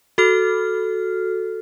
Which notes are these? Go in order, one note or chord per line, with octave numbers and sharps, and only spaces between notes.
F#4 A4 F6